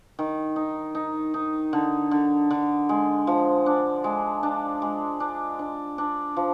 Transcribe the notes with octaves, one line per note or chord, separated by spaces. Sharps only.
D#3
D#4
D#4
D#4
D3
D3
D3
G#3
F3
D4
G#3
D4
G#3
D4
D4
D4
F3